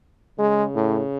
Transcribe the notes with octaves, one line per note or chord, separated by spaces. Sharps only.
C#3 G#3
A2